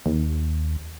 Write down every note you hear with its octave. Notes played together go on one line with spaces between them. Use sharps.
D#2